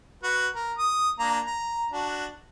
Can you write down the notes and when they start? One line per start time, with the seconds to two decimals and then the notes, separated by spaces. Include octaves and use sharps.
0.23 F#4 B4 F#5
0.55 A#4
0.79 D#6
1.19 A#3 D4 A#5
1.47 A#5
1.92 D4 F#4